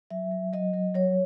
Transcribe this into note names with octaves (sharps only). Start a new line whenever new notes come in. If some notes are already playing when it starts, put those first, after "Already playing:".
F#3 E5
F#3
F#3 D#5
F#3
F#3 C#5